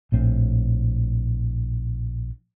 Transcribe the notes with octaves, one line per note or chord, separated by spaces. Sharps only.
A#1 A2 C4